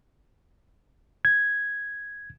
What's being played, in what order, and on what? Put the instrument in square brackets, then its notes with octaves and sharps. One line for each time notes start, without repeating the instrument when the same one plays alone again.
[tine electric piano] G#6